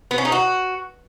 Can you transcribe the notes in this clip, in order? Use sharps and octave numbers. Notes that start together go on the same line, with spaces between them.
B3
C#4
D#4
F#4